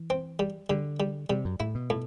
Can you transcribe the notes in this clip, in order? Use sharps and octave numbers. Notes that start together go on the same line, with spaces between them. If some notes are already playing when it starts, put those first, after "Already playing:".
Already playing: E3
C4
G3
D3 G3
G3
C3 G3
F#2
A2 E4
B2
A2